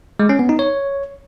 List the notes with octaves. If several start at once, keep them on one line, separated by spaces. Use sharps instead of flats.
G#3
C#4
B3
D#4
C#5